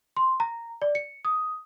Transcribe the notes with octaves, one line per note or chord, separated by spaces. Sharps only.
C6
A#5
D5
C#7
D#6